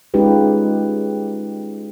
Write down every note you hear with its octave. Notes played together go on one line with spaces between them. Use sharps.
G#3 C#4 D#4 F4 G4 B4